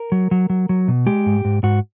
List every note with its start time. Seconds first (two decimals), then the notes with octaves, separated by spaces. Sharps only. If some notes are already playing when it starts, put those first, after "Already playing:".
Already playing: A#4
0.12 F#3
0.31 F#3
0.50 F#3
0.69 F#3
0.88 B2
1.07 G#3 G4
1.26 G#2
1.45 G#2
1.63 G#2 F#4